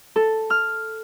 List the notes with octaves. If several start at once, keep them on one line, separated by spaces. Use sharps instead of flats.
A4
F6